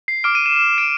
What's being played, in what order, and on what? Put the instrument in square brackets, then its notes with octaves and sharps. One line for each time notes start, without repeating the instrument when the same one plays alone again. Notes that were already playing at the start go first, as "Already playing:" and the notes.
[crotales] C7
D6 F6 D7
D#7
E7
E7
D7